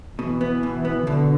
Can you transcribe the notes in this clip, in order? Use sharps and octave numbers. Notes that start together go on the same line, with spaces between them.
B2 E3
B3
B2
B3
B2 D3